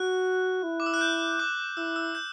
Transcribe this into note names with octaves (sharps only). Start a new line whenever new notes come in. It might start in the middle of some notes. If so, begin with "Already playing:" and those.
Already playing: F#4 F#6
E4
D6
E6
F#6
G6
D6
E4 E6
E6
G6